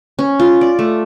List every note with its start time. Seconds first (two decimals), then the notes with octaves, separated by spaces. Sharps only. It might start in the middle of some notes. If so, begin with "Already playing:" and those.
0.19 C#4
0.40 F4
0.61 D5
0.79 A3